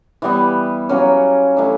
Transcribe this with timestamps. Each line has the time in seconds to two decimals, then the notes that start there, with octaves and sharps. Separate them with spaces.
0.22 E3 G3 B3
0.89 F#3 A#3 C#4
1.57 E3 A3 D4